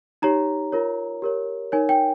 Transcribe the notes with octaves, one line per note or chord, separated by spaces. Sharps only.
D#4 G4 C#5 A#5
F4 A#4 C#5
G4 A#4 C#5
D#4 A#4 C#5 G#5
G5